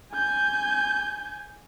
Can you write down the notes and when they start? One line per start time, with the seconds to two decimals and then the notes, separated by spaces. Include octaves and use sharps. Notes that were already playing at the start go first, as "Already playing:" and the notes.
0.13 G#5 G6